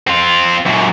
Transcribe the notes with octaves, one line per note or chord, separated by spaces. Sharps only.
C4 F4
F#2 A#2